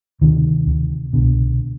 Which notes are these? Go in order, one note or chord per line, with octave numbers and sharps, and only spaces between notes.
D2 C3 D#3
D2 C3
C2 B2 D3